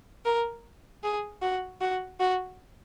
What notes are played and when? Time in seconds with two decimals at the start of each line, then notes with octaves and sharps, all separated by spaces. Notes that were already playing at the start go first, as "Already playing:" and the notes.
0.25 A#4
1.04 G#4
1.42 F#4
1.81 F#4
2.20 F#4